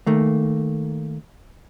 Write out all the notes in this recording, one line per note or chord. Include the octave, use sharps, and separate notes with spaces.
D#3 A3 A#3